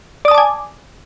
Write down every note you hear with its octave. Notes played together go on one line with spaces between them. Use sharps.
D5 G#5 A5 D6 D#6